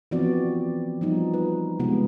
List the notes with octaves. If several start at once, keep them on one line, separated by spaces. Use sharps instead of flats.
E3 F3 B3 C4 F#4 D5
F3 G3 B3 D#4
B4
C3 G#3 B3 F4